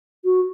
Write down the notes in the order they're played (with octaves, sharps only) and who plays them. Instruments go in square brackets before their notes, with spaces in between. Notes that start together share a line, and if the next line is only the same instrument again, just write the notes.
[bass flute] F#4